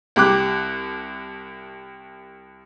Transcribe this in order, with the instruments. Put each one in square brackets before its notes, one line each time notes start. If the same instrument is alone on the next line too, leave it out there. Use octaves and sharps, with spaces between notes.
[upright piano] C2 G4 D6 F#6